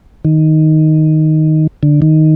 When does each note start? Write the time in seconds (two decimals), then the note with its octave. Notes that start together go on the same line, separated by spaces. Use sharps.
0.25 D#3
1.83 D3
2.02 D#3